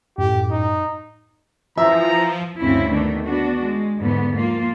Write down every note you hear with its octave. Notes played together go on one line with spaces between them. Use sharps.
F#2 A2 G4
D#4
E3 F3 E5 A#5
D2 G2 C#3 C4 C#4 E4
D#3 A3 B3 D4
B3 D4 F#4
G#3
E2 G#2 D3 B3
F3 A#3 F4